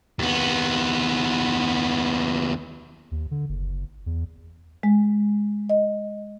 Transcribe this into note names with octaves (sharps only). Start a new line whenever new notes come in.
D#2 B3
D#2
D3
F#1
E2
G#3
D#5